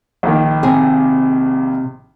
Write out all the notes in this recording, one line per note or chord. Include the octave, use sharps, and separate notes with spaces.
A#1 D#3
C3 G#4